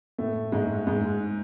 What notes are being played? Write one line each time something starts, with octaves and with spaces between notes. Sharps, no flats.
A2 A3
G#2 G#3
G#2 G#3